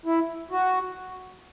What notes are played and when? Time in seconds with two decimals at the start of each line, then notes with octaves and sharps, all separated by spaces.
0.06 E4
0.51 F#4